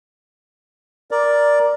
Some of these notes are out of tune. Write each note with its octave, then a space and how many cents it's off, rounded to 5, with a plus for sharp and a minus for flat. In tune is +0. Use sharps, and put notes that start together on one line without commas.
A#4 +10 D5 +0